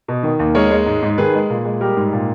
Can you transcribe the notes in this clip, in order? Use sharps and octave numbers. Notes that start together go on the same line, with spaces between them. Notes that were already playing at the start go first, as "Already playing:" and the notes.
B2
D#3
D#2
G#3 A#4 C#5
G#3
G#2
G#2
D#3 G#4 B4
G#3
A#2
G#3
G3 G4 A#4
G#2
A#2